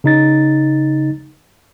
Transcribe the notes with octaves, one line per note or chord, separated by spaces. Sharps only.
C#3 D#4 A6